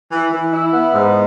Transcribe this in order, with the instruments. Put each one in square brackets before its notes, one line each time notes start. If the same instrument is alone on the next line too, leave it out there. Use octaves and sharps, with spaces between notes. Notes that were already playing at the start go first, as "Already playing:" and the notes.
[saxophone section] E3
E3
E4
B3
G#2